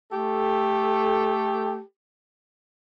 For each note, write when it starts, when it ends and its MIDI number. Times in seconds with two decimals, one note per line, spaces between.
0.12 1.79 57
0.12 1.79 67
0.12 1.79 69